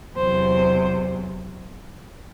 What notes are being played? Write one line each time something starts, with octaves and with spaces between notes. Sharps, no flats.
E2 C3 F#3 C5